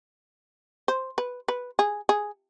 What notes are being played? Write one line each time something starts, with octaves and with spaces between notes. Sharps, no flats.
C5
B4
B4
G#4
G#4